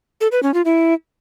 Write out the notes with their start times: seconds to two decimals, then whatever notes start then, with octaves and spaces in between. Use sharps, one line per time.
0.21 A4
0.32 B4
0.43 C#4
0.54 F4
0.65 E4